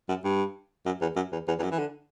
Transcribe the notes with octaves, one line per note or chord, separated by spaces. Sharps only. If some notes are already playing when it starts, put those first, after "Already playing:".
F#2
G2
F#2
E2
F#2
E2
E2
E2
F#2
E3
D3